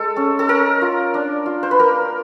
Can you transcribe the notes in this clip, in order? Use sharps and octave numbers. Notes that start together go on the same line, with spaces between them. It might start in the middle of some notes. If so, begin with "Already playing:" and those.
Already playing: G#3 A4
C#4
A4
C#4 A#4
F4
D4
F4
C5
B4
A#3 A#4